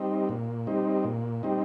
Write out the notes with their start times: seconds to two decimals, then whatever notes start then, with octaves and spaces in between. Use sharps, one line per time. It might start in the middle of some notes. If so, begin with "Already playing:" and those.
Already playing: G3 C4 D#4
0.29 A#2
0.67 G3 C4 D#4
1.04 A#2
1.43 G3 C4 D#4